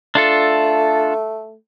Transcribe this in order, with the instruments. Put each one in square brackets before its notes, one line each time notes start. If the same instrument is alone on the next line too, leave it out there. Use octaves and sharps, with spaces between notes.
[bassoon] A3 [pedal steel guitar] D4 F4 A4